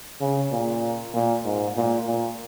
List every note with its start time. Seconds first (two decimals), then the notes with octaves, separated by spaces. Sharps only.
0.21 C#3
0.51 A#2
1.14 A#2
1.45 G#2
1.76 A#2
2.07 A#2